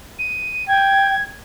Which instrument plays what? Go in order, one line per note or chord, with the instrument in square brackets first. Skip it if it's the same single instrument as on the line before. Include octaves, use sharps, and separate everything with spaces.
[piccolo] D#7
[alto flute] G5 [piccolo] G#6